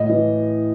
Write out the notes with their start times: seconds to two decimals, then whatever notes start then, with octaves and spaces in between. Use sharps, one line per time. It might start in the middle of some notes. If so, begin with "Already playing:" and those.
Already playing: A2 D#5
0.09 E3